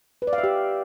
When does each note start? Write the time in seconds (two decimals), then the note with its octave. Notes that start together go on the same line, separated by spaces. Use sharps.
0.22 B4
0.27 D5
0.33 F5
0.38 E5
0.44 G4